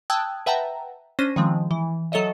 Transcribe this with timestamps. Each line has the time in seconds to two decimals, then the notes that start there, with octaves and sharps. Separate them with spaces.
0.10 G5 A5 D#6 E6 F#6 G#6
0.46 B4 E5 F#5 G5 A5 A#5
1.19 C#4 D4 C5 A#6 D#7
1.36 D#3 F3 G#3 C4
1.71 E3
2.12 F#3 A4 C#5 D#5 E5